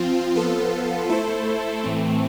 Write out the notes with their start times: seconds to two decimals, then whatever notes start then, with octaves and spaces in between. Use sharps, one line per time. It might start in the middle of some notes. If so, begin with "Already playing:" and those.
Already playing: F3 C4 F4
0.35 F3 B3 F4 A4
1.09 A3 E4 A4 C5
1.84 A2 E3 A3 C4